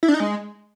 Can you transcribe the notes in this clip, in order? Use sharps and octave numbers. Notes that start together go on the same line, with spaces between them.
E4
D4
D#4
G#3